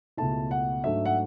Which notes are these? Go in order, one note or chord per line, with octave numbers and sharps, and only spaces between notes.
C#2 B2 A3 E4 A5
F#5
G#2 F#3 A3 D4 E5
F#5